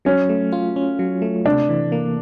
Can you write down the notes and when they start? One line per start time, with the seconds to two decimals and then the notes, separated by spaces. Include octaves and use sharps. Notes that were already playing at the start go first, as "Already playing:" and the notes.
0.05 F#3 C#4
0.29 A3
0.53 F4
0.76 C#4
0.99 F#3
1.22 A3
1.45 C3 D4
1.69 E3
1.92 A#3